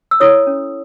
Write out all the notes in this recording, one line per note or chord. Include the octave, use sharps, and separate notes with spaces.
E6
E4 A4 C#5 D#6
C#4